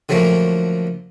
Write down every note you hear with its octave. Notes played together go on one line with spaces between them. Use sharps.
D3 F3 F#3 A3 A#3